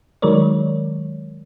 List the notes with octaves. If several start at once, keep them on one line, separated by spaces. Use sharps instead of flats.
D#3 F#3 G#3 A#4 C#5 D5